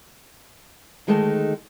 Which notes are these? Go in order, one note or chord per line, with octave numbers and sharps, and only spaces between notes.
D2 D#3 G#3 A3 D#4 A5